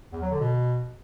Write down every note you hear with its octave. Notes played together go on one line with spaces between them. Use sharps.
E2
F#3
D3
B2